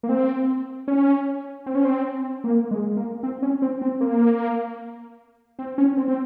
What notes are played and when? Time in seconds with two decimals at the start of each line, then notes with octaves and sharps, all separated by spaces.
0.03 A#3
0.09 C4
0.88 C#4
1.66 C4
1.75 C#4
1.85 C4
2.44 A#3
2.71 G#3
2.97 A#3
3.23 C4
3.42 C#4
3.62 C4
3.82 C4
4.01 A#3
5.59 C4
5.78 C#4
5.97 C4
6.08 C4